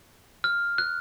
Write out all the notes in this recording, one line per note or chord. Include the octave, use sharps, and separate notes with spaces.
F6
F#6